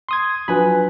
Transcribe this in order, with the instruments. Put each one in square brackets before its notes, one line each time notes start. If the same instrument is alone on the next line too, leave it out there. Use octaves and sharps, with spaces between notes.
[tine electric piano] C6 D#6 G#6
[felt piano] F3 F#3 D4 [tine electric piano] B4 G#5 B5